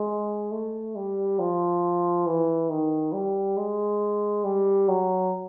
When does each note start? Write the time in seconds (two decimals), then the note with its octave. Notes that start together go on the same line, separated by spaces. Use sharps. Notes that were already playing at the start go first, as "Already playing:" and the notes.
Already playing: G#3
0.52 A3
0.96 G3
1.39 F3
2.26 E3
2.70 D#3
3.13 G3
3.57 G#3
4.44 G3
4.88 F#3